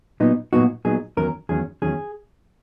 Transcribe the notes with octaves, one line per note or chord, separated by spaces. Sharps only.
A#2 F#3 B3 D#4
A#2 F#3 B3 D#4 F#4
A#2 F#3 B3 D#4 G#4
E2 D#3 F#3 C#4 A#4
E2 D#3 F#3 C#4 G#4
E2 D#3 F#3 C#4 G#4